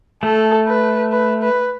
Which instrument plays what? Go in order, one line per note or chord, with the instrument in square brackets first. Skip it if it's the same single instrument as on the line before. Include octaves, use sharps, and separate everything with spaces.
[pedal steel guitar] A3 [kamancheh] A4
[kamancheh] B4
B4
B4